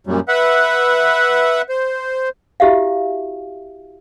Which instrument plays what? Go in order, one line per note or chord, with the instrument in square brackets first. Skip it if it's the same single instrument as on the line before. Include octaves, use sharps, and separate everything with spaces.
[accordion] F#2 A#2 F#3 G3
B4 E5 F#5
C5
[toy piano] E4 F#4 G4 E5 F5